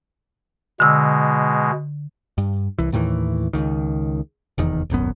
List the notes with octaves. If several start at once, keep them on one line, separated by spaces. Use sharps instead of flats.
B2 D3 G#3 E6
G2
C2 E3
D#2 A2 D#3 E3
C#2 D#3
F1 E2 D#3
D#1 G#1 F#2 B3